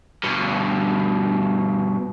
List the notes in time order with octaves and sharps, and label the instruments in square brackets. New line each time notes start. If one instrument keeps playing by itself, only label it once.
[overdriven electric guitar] G2 B2